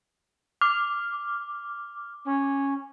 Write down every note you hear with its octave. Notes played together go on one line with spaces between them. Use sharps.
D6 F6
C#4